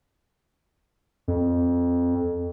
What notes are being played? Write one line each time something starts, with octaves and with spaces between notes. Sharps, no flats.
F2